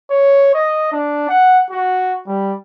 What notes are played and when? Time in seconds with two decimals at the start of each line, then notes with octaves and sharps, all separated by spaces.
0.11 C#5
0.54 D#5
0.92 D4
1.29 F#5
1.71 F#4
2.27 G3